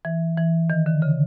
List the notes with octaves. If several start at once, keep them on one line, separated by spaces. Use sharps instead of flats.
E3
E3
D#3
D3
C#3